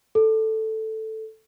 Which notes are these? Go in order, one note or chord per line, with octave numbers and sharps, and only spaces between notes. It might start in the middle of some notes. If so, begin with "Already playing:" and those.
A4